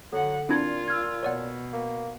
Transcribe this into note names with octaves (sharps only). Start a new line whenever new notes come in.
D3 F#3 A4 F#5
A#2 C4 D4 E4 F4 D5 G#6
E6 F6 G#6
B2 C#5 D5 F#5
A#3